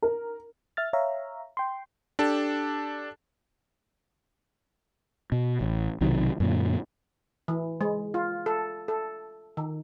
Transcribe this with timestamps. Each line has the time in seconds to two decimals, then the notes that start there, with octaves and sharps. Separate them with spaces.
0.02 A#4
0.77 E5 F6 A6
0.93 C#5 E5 F5 A#5
1.57 G5 C6
2.19 D4 G4 A4 A5
5.32 B2
5.61 A1
6.01 B1 C3 D#3 F#3
6.40 F#2 A#2 D3
7.48 E3
7.81 G#3
8.14 F4
8.46 A4
8.88 A4
9.57 D#3